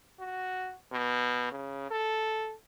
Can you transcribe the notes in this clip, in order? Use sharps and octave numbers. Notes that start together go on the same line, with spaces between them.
F#4
B2
C#3
A4